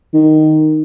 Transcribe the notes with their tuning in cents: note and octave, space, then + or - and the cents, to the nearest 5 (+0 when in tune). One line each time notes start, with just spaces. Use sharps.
D#3 -5